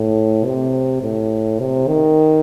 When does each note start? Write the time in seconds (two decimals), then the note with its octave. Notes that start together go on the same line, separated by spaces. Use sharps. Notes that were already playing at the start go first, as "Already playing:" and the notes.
Already playing: A2
0.45 C3
1.02 A2
1.60 C3
1.88 D#3